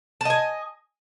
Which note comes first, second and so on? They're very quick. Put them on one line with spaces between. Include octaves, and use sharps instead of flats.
A5 D#5 G#5